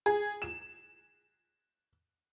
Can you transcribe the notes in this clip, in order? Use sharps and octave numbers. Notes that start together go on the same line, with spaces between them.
G#4
E7